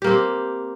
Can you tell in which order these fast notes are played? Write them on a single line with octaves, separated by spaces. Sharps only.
G4 A#3 C4